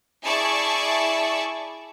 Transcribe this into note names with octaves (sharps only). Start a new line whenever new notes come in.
E4 G#4 D5 A5 C#6